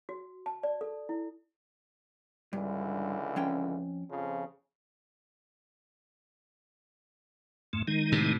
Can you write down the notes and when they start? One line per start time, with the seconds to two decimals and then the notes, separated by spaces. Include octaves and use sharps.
0.09 F#4
0.46 A5
0.63 D5
0.81 A4
1.09 E4
2.53 C#2 G2 D3 E3
3.36 F2 C#4 G5
4.09 F2 C#3 F3
7.73 F2 G#2 A3
7.88 D#3 G#3 D#4
8.12 A2 C3